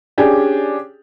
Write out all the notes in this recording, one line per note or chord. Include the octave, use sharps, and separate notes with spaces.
C#4 D4 G4 G#4